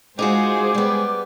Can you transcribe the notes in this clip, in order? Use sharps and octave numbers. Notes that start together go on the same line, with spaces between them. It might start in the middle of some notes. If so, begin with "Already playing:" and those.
G#3 D#4 F4 F#4 G#4 C5 D6
G3 B3